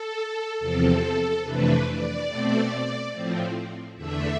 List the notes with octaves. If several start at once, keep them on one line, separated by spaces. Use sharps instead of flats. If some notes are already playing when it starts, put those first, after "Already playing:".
Already playing: A4
E2 C3 F3 C4 A4
F2 C3 E3 A3 D4 B4
D5
B2 A3 C4
A2 F3 C4
E2 D3 A3 D4 E5